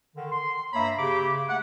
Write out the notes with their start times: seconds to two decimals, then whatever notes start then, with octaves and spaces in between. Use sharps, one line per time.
0.16 D3 D#3
0.32 C6
0.73 G2 A#3 C#5 E5 A#5 B5
0.99 C#3 G4 B5 D6
1.48 A3 F#5